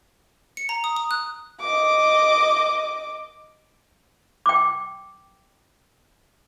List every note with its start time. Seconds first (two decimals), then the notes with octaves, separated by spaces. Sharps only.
0.57 C#7
0.69 A#5
0.84 D#6
0.96 D#6
1.11 F#6
1.61 D#5 D6
4.46 G5 D6